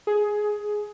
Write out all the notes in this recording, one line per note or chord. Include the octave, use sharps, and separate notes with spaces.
G#4